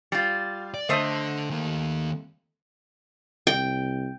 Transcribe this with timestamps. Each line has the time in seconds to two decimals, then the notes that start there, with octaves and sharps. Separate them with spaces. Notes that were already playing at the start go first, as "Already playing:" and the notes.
0.12 G3 F4
0.74 D5
0.89 D3 A3 C5 D#5
1.50 D#3 A#3
3.47 C2 G5